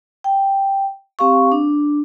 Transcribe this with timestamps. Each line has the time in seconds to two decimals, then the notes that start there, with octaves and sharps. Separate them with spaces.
0.24 G5
1.19 C4 G4 F5 C#6
1.52 D4